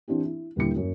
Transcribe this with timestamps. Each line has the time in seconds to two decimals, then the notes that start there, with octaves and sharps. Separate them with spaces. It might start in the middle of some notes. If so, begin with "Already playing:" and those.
0.08 E3 C4 D4 E4 G4
0.25 E4
0.56 D#1 D3 G3 E4 C#7
0.76 F#2